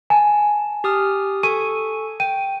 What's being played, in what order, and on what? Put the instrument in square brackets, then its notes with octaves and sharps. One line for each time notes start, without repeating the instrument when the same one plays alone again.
[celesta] G#5 [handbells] A5
[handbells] G4 D#6 F6
[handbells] A4 G#5 C#6 [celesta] D#7
[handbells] G5 [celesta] D#7